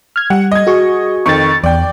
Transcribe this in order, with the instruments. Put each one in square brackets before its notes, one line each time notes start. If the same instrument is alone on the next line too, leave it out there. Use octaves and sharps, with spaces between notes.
[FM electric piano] F6 G#6
[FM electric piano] G3 [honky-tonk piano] F#5
[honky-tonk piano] D#5 G#6
[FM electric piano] F#4 G#4 C#6
[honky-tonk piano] F2 D#3 [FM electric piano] C#6 A6
[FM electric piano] E2 [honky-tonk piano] D5 G5